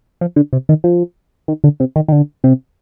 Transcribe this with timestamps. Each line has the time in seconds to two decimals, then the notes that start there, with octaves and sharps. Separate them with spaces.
0.21 F3
0.36 D3
0.53 C3
0.69 D#3
0.84 F3
1.48 D#3
1.64 D3
1.80 C3
1.96 D#3
2.08 D#3
2.12 D3
2.44 C3